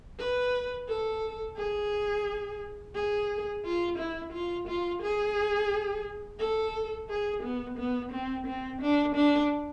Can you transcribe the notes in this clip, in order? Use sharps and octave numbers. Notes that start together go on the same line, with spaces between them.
B4
A4
G#4
G#4
F4
E4
F4
F4
G#4
A4
G#4
B3
B3
C4
C4
D4
D4